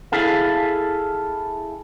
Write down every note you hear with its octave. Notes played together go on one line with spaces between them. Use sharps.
E4 G#4 A4 F5